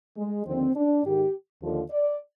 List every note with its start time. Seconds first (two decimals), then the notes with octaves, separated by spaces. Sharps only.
0.18 G#3
0.47 D#2 D3 F3 C4
0.76 D4
1.04 G#2 D#3 G4
1.62 D#2 D3 F3
1.91 D5